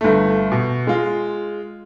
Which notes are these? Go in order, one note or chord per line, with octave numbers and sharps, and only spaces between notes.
G1 A3
B2
G#3 F4